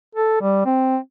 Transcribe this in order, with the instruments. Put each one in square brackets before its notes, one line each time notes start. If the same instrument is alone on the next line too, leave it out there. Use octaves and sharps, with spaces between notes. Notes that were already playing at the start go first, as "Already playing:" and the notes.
[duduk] A4
G3
C4